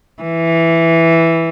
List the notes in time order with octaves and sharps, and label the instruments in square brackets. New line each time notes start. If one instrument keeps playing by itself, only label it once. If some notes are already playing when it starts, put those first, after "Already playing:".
[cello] E3